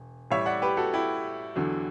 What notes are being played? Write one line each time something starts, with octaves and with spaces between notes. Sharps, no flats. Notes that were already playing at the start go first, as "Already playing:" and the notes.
Already playing: E1
A1 A2 G3 C#5 E5
D5 F#5
G4 B4
F#4 A4
E4 G4
E2 D3 F#3